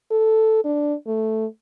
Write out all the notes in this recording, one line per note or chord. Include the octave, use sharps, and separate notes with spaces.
A4
D4
A3